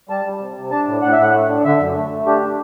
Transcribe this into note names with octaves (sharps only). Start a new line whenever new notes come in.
G3 A5
G3
C3
C3
D4 A5
A2
A2 F#5
E5
A2 F#5
A3
D4
D3 E5
F#2
A3
A3
D4 G4
D4